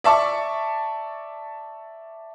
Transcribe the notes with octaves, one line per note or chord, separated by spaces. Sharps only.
D5 E5 A5 C#6 D6